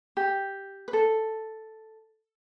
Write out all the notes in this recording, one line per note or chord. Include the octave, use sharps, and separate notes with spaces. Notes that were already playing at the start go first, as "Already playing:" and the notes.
G4
B4
A4